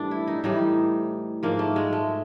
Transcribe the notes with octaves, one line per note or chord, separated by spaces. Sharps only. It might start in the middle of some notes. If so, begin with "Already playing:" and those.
Already playing: A2 E3 G3 D4
E4
D#4
A2 E3 G3 D#4
G#2 F3 A#3
A3
G#3
A3